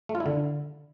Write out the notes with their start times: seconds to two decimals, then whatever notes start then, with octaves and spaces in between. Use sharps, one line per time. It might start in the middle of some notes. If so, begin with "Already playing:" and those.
0.09 A3
0.15 F4
0.20 E4
0.26 D3